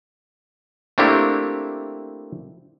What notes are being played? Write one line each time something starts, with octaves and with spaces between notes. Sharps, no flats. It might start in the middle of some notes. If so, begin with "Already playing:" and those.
A3 A#3 C4 D4 E4 G4